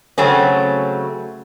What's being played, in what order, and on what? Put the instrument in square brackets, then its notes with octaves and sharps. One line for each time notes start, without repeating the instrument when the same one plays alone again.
[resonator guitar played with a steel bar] C#3 F#3 A3 C4 C#4